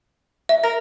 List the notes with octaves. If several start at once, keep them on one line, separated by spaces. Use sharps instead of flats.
E5
A#4 A#6